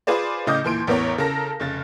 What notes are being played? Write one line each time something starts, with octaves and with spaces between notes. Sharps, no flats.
F4 G#4 B4 C5 D5
A2 C#3 D#5 D6 D#6 G6
D#2 A#2 E3 C6 D7
A1 E2 B3 A#4 C#5
C#3 A4 A#4 A#6
F1 C#3 A6